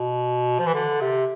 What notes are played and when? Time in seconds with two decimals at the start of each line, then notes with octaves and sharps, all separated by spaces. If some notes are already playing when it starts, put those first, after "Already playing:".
Already playing: B2
0.59 F3
0.66 E3
0.74 D3
1.01 C3